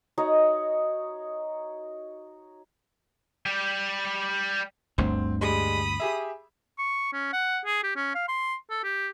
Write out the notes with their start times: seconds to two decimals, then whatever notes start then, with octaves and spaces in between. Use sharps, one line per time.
0.18 D#4 F#4 C#5 D#5
3.46 G3 G4
4.98 G1 D2 G2 C4
5.41 G3 G#3 B5 D#6
6.00 G4 G#4 E5
6.78 C#6
7.13 C#4
7.33 F#5
7.65 G#4
7.83 G4
7.96 C#4
8.15 F5
8.28 C6
8.70 A4
8.83 G4